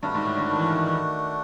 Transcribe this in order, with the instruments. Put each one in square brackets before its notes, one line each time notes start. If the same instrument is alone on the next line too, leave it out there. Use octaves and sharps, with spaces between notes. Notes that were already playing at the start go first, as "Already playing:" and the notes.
[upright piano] G2 [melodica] A3 D4 F#4
[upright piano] G#2
A2
D3
D#3
E3
D#3
D#3